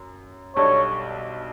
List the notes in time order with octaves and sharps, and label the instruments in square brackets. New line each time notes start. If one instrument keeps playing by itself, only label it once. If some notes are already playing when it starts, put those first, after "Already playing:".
Already playing: [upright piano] F#2
[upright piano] B1 B2 G3 D4 A4 [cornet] C#5